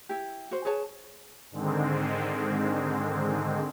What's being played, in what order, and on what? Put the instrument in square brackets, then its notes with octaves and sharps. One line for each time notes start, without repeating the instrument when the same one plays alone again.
[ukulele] E4 G4
F#4 C5
G#4 B4 C#5 A5
[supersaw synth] G#2 D3 D#3 G#3 C4